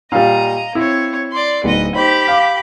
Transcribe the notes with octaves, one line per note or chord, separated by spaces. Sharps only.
A#2 G3 D#5 F5 A#5
C4 E4 C#5
D5 C6
D1 B3 D#4 D#5
D#4 G4 C5 B5
F5 D6